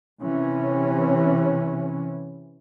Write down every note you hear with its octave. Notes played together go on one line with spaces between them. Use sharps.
C3 E3 C#4